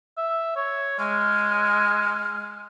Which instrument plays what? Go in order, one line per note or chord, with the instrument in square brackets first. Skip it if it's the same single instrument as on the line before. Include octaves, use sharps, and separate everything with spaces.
[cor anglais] E5
C#5
[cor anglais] G#3 [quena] F6